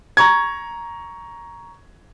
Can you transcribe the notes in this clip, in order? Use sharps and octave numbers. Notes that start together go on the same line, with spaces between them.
A#5 C#6 G#6